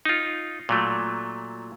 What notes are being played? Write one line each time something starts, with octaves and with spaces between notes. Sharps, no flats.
D#4 F4
A#2 F#3 A3